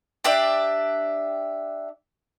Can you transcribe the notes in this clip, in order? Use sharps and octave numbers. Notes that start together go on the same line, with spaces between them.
D4 G4 D5 E5